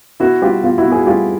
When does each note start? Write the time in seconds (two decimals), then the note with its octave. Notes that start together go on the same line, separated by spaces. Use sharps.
0.20 B2 E4 F#4
0.42 G3 F4 G4
0.63 B2 F4
0.78 E4 F#4
0.84 B2
0.92 F#4 G#4
1.06 G3 F4 G4